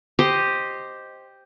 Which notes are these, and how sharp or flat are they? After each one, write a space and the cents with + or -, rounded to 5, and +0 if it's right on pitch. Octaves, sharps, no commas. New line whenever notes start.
G4 +0 C5 +0 D#5 +0